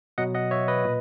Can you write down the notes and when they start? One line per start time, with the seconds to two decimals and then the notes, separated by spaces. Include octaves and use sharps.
0.18 B2 F#3 D#5 F#5
0.35 D#5 F#5
0.51 C#5 E5
0.68 B4 D#5
0.85 A#2